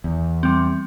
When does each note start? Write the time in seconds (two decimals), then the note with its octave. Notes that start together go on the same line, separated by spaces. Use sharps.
0.04 E2
0.43 G3 C4